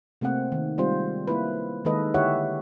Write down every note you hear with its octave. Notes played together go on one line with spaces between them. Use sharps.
C3 A3 A#3 C4 F#5
D#3
G3 G#3 C4 F4 C5
A#3 E4 B4
D#3 G#3 A#3 A4 B4 D#5
D3 E4 G4 C#5 E5 F#5